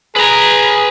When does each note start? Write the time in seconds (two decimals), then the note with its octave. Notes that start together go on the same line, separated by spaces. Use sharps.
0.16 G#4 B4 A#5